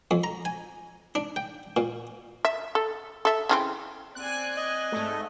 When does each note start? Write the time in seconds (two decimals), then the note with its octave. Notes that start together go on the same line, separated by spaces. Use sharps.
0.11 F2
0.24 A#5
0.45 G#5
1.15 D4
1.36 G5
1.77 A#2
2.45 E5
2.75 A4
3.25 A4 E5
3.49 C#3 E3 C4
4.15 C4 D5 G#5 F#6
4.57 D#5
4.92 G#2 A3